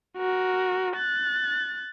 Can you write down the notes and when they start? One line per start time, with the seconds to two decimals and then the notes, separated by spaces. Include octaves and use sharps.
0.17 F#4 A#4
0.95 F#6 A6